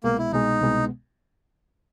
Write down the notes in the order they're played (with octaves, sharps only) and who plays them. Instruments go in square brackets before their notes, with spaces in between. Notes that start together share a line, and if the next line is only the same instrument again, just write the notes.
[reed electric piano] C2 B2 G#3 B3 [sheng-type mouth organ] A#3
[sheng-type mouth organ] E4
[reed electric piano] C2 B2 G#3 B3 [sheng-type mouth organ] D#4
[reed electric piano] C2 B2 G#3 B3